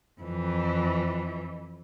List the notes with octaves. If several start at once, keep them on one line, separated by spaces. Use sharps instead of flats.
F2 E3